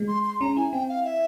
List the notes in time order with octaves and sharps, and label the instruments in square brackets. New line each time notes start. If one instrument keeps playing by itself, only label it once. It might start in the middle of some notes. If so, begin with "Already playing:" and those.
Already playing: [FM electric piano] G#3
[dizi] C6
C6
[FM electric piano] C#4 [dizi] A#5
[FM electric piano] E4 [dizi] G#5
[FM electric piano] C4 [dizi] G5
[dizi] F5
E5